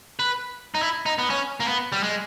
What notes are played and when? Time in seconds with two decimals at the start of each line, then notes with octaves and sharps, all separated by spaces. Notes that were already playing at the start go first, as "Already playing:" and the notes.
0.19 B4
0.75 D#4
0.81 E4
1.06 D#4
1.18 B3
1.30 C#4
1.60 A#3
1.66 B3
1.92 G3
2.03 G#3